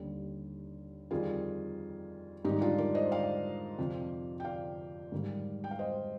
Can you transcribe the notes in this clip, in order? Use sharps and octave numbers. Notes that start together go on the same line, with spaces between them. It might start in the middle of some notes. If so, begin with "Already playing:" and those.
Already playing: D#2 D3 G3
F2 D#3 G3 F4 G#4
G#2 D#3 G3 D#4 G4
D4 F4
A#4 D5
C5 D#5
D5 F5
F2 C3 F3
G5
D5 F5
G#2 D#3 G3
G5
F5
C5 D#5